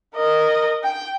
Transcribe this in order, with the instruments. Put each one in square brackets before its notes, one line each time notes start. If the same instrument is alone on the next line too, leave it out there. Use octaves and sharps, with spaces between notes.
[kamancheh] A#4 D#5
G5